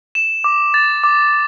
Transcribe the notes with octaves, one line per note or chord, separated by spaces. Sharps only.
E7
D6
A6
D6